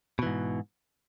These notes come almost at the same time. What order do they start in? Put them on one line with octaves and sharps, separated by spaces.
B2 E3 G#2